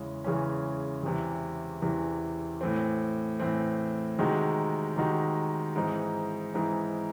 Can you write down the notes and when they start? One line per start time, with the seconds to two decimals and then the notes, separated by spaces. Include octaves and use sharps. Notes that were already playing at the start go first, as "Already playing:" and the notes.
Already playing: E2 C#3 E3 G#3 C#4
0.24 E2 C#3 E3 G#3 C#4
1.03 E2 C3 E3
1.82 E2 C3 E3
2.61 A2 E3 C4
3.40 A2 E3 C4
4.18 C3 D#3 G#3 D#4 F#4
4.96 C3 D#3 G#3 D#4 F#4
5.76 G#2 E3 C4 D#4
6.54 G#2 E3 C4 D#4